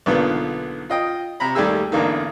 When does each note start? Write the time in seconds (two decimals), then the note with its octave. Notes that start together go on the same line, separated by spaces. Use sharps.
0.06 B1 G#2 D3 A#3 B3 F4
0.90 F4 D#5 G5
1.40 C3 A#5 B5
1.55 D#2 G3 A3 G4 G#4 E6
1.92 G#1 E2 D3 A#3 D#4